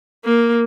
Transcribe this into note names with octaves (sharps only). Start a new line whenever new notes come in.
A#3